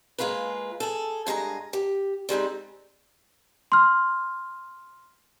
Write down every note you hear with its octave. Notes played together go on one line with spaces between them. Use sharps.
G#3 A#3 F4 G#4 B4
G#4 A4
G2 G#3 D#5 A#5
G4
G3 G#3 C4 D#4
C6 F6